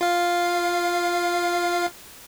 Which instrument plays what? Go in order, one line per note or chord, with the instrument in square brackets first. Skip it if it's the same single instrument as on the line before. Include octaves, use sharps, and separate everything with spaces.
[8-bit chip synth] F4 F5